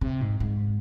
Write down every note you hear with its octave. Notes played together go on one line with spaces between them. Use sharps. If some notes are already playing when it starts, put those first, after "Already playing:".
C3
G#2
G#2